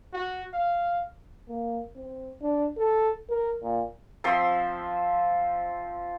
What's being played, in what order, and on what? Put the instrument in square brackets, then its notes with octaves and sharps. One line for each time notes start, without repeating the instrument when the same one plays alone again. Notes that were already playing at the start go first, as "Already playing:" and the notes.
[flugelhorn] F#4
F5
[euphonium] A#3
C4
D4
A4
A#4
A#2
[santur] F3 C4 E5 C6